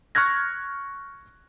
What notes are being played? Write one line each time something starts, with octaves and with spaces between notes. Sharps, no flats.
C#6 F6 F#6 G#6 A#6